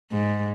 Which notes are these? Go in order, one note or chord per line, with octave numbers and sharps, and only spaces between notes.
G#2